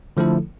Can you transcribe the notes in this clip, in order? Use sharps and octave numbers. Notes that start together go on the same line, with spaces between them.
D3 F3 A3 E4 A4